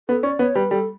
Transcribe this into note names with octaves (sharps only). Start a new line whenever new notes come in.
B3 A4
C#4 D5
B3 C#5
G3 B4
G3 A4